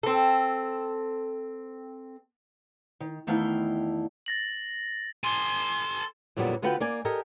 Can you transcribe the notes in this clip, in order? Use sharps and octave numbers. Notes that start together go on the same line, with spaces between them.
C4 A4
D#3
E2 D#3 A3 E4 F5 G5
A6 A#6 F#7
A4 G#5 C6
F2 A#2 D3 F#3 G3 B3
D3 B3 F4 F#4 B4 G5
A#3 D5 G#5
G4 A4 A#4 D#5 G#5